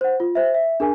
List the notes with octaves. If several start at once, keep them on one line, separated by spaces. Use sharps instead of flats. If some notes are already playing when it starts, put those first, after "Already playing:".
C5 F#5
F4
C5 E5
E5
D4 G#4 A#4 G#5